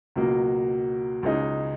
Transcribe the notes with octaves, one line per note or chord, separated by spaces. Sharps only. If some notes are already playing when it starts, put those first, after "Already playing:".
C#2 B2 F#3 A#3
C#2 C#3 G#3 D#4